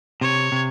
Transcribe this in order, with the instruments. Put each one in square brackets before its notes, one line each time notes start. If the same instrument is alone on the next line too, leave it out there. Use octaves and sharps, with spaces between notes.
[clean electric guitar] C3 [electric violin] C#5
[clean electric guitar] C3